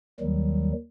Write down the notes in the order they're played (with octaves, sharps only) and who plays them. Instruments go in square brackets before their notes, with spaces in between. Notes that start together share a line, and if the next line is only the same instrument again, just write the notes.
[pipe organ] D#2 D#3 F#3 G3